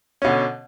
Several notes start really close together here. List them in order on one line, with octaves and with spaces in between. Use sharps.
C#4 B2 D3